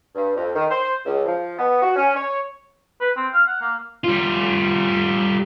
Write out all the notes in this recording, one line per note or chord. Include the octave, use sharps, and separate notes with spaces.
G2
F2
D#3
C5
C#2
F3
B3
F#4
C#4
C#5
B4
C4
F5
F#5
A#3
G3 F4